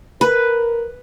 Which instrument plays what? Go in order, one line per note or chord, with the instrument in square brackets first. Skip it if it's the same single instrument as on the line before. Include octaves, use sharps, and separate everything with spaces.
[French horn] A#4 [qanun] B4